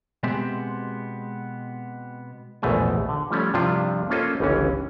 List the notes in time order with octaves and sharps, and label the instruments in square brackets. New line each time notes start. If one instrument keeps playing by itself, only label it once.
[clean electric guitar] B2 G#3 B3 C4 G4 E5
[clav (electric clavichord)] A#1 E2 G#2 B2 A3 G#5
D3
F3 G3 A3 C#4
G2 C3 F3 D4 E4 F4
A#3 C#4 F4 A4 C5 D#5
G1 C#2 E3 C#4